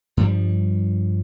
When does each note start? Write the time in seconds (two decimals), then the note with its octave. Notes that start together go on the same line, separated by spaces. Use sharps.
0.17 G2 F3 G3